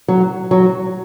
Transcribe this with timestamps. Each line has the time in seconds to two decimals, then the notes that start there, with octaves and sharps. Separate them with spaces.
0.08 F#3
0.51 F#3